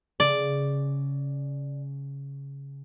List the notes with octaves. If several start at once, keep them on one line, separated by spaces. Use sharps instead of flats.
C#3 D5